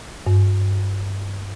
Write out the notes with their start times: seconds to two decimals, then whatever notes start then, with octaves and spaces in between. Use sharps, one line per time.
0.27 G2